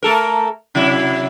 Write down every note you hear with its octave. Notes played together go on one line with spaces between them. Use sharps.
A3 A4 A#4
C3 F#3 E4